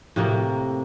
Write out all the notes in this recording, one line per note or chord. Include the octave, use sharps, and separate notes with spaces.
A2 C3 A#3